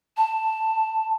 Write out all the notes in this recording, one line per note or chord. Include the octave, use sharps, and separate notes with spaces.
A5